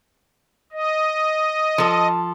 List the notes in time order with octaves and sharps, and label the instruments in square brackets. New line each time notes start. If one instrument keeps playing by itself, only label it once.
[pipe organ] D#5
[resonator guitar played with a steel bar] F3 A4